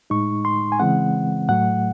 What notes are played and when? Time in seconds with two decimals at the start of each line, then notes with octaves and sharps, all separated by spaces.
0.10 A2 G#3 D#4 C#6
0.45 C6
0.72 G#5
0.80 C#3 E3 G#3 C4 F#5
1.49 A2 F#3 A3 F#5